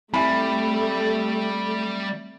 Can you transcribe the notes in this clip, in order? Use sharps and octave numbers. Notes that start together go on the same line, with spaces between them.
G3 A3 C4 E5 B5